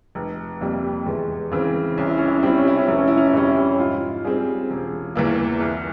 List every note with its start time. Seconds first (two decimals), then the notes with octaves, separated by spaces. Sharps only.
0.15 F1
0.61 F2 C3 G3 A#3
1.06 E2 G#3
1.51 C#3 E3 C4
1.97 C2 C#4
2.07 E4
2.18 C#4
2.27 E4
2.37 C#4
2.43 C3 G3 C4 E4
2.57 C#4
2.67 E4
2.77 C#4
2.87 F1 E4
2.98 C#4
3.08 E4
3.17 C#4
3.28 E4
3.33 F2 C3 G3 C#4
3.47 E4
3.57 C#4
3.79 G#2 F4
4.24 G3 C4 G#4
4.70 E1
5.15 E2 E3 A#3
5.60 C2